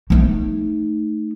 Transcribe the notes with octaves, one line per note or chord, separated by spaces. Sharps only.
A3 D#4